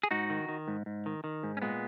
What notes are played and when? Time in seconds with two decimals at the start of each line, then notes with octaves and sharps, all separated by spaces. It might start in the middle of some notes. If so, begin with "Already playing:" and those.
0.03 G#4
0.11 G#2 D#4 F#4
0.30 D#3
0.49 D#3
0.68 G#2
0.86 G#2
1.06 D#3
1.24 D#3
1.43 G#2
1.57 C#4
1.62 A#2 G#3 B3